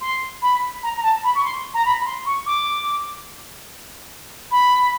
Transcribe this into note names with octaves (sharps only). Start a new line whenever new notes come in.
C6
B5
A#5
A#5
A5
B5
C#6
C6
A#5
B5
B5
C6
C#6
D6
B5